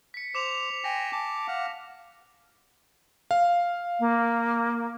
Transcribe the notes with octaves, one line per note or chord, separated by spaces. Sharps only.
B6 C#7
C5 D6 E7 F7
G5 G#5 A#6
A5 D6
F5 F#5
F5
A#3